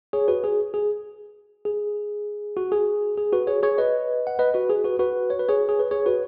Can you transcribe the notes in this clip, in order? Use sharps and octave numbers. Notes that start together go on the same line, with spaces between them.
G#4 C#5
F#4 B4
G#4
G#4
G#4
F#4
G#4
G#4
F#4 B4
G#4 C#5
G#4 C#5
B4 D#5
F#5
B4 D#5
F#4 B4
G#4
F#4 B4
F#4 B4
C#5
B4
G#4 C#5
G#4
B4
G#4 C#5
F#4 B4